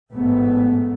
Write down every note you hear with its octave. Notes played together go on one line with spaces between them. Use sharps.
A1 G#2 A3 B3